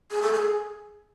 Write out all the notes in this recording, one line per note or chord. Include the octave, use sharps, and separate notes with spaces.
G#4
A4
G#4